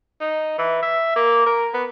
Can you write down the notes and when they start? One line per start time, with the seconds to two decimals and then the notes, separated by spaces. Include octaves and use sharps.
0.21 D#4
0.58 E3
0.83 E5
1.16 A#3
1.46 A#4
1.74 B3